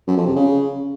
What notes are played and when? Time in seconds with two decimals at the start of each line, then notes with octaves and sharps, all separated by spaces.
0.07 F#2
0.17 F2
0.26 C3
0.36 C#3